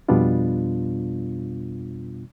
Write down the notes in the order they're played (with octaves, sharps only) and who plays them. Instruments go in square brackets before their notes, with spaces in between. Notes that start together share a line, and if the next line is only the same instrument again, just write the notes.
[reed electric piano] F2 B2 G3 B3 D4 F4